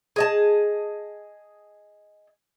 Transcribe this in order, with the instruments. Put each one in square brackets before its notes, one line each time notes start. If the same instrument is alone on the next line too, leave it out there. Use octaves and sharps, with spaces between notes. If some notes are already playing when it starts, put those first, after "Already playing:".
[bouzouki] G#4 D#5 A5